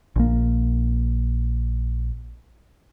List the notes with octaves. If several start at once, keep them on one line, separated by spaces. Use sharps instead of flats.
A#1 A#3